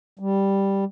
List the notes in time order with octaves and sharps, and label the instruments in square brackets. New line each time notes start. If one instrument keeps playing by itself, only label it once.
[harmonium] G3